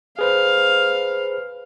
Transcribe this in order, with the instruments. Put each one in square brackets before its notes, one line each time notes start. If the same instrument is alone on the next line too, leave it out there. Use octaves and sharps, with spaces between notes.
[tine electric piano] G#4 B4 C5 [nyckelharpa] F5